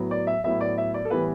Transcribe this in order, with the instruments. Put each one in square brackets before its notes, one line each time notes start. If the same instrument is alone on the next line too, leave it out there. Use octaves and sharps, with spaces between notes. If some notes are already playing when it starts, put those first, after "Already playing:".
Already playing: [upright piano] A2 F#3 B3
D5
E5
A2 F#3 B3 E5
D5
E5
D5
A4
A2 E3 G3 B3 B4